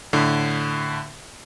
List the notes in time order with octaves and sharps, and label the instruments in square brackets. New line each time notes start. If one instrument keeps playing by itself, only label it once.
[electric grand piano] A2 D3